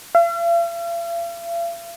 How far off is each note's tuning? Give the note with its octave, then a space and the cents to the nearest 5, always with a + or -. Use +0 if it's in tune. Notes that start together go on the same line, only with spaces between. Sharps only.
F5 -45